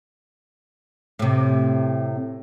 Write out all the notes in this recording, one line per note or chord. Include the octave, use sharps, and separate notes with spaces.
A2 C3